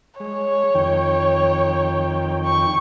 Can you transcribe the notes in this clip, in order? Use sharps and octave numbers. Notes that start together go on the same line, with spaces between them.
G#3 C#5
F2 D#3 G5
C#6